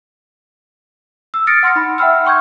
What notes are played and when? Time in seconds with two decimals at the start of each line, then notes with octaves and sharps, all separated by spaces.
1.34 E6
1.47 D#6 F6 A6 A#6 C#7 D7
1.63 F#5 C6 F6 A#6 C#7
1.76 D#4 B5
1.98 E5 F#5 G5 B5 E6 F6
2.25 G5 C6 C#6 F6 G6 G#6